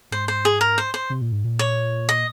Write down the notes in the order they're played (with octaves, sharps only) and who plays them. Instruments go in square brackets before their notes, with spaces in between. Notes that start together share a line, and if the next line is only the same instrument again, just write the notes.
[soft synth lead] G#2 [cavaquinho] C5
[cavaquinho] C5
G#4
A#4
C5
C5
[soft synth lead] C3
A#2
G#2
A#2
[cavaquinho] C#5
D#5